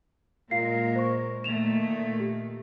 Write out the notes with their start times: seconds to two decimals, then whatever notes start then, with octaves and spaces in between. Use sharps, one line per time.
0.51 A#2 G#3 F4 A#4 F5 C7
0.95 C5 C#6
1.44 A#2 D#3 A3 E7 F7
2.20 G4